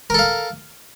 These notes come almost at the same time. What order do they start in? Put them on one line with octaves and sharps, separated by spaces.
A#4 A4 F5